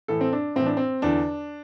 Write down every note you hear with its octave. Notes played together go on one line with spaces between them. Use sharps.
A2 E3 A4
C4
D4
A2 E3 C4
D4
C4
E2 D3 D4